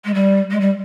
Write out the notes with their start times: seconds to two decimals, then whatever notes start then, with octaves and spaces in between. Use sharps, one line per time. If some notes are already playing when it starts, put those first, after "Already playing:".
0.05 G#3
0.14 G3
0.51 G#3
0.61 G3